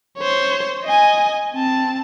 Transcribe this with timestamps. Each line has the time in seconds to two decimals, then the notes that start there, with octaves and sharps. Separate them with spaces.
0.18 C5 C#5
0.85 D#5 G#5
1.54 C4 A5